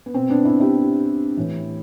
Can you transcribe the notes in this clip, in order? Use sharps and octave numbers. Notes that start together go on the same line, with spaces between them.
B3
B2 C4
B3 D4
C4 E4
E4 G4
A2 E3